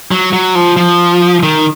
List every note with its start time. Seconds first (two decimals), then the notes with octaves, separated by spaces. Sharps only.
0.11 F#3
0.33 F#3
0.55 F3
0.77 F3
1.43 D#3